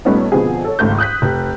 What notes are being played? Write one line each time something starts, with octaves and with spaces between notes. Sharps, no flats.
A#2 G3 A3 B3 C#4 D#4
B2 D3 F3 B3 C4 G#4
A4 C#5
G#1 C#2 A3 G6
D#6 F#6 G6 B6
F1